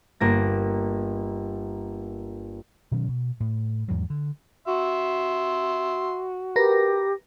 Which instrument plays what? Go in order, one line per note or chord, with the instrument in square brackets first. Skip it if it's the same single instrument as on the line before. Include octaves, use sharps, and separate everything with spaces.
[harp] G1 A#3 A#6
[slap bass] B2 D#3 F#3 C#4
B2
A2
E2 G#2 F3 F#3
D3
[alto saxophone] F#4 [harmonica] E5 C6
[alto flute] G4 [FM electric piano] A#4 B4 A#6